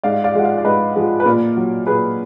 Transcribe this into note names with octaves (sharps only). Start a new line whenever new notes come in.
G#2 D5 F5
D5 F5
F3 G#3 F#5
D5 F5
D5
G#2 B4 D#5
F3 G#3
B4
A#2 A#4 D5
F#3
A#2 G#4 B4